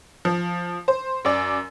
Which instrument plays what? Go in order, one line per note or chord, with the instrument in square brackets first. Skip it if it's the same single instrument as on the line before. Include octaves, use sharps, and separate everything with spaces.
[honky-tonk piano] F3
C5
F#2 D5